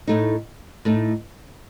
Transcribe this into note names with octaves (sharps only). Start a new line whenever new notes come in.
A2 A3 D#4
A2 A3 D#4